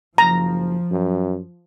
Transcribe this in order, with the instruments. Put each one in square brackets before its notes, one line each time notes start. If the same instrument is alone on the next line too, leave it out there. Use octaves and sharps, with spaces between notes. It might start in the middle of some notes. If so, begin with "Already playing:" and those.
[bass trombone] F#1 [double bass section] F3 [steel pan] A#5
[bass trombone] F#2